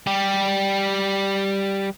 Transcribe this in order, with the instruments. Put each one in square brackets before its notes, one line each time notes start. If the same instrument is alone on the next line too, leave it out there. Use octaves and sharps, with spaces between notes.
[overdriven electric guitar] G3 G4